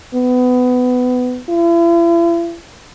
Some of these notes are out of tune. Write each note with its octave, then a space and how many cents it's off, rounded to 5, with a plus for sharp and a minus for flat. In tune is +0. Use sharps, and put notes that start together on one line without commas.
B3 +20
E4 +45